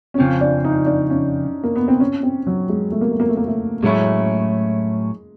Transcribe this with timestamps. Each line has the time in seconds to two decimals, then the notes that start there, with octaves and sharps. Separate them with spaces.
0.14 C#4
0.18 F2 C#3 F3 C4
0.41 D4
0.65 D#4
0.86 D4
1.10 C#4
1.64 A#3
1.76 B3
1.88 C4
2.00 C#4
2.23 C4
2.47 F#3
2.69 G#3
2.92 A3
3.01 A#3
3.10 A3
3.20 A#3
3.29 A3
3.37 A#3
3.47 A3
3.83 A2 F#3 G#3 A3 C#4 E4